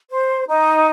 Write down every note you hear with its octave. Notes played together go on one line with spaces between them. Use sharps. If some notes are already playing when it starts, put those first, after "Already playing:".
C5
D#4